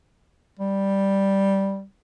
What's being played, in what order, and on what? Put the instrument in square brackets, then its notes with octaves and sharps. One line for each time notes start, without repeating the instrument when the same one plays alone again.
[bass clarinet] G3